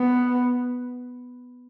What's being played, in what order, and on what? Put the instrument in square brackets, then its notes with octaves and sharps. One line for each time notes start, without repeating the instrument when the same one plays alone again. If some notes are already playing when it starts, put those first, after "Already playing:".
Already playing: [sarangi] B3